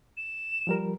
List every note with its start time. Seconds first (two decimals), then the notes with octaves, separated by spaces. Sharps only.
0.17 E7
0.67 F3 G3 A#4